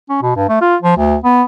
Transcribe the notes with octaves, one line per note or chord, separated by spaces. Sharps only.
C#4
B2
G2
A3
F4
F3
D2
B3